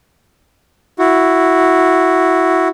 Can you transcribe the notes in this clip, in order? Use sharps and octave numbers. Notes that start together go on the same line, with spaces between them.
E4 F#4